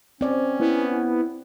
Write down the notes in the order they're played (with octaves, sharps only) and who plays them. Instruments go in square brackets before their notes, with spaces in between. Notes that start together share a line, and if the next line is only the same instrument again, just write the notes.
[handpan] C4 D5 [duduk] C#4
[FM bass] B3 [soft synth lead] E4